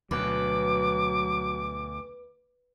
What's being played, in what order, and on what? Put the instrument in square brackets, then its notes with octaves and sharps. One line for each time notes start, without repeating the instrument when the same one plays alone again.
[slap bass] D2 B2 [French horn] F#3 [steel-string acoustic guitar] B4 [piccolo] D6